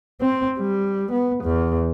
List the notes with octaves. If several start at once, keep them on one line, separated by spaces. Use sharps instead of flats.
C4
G3
B3
E2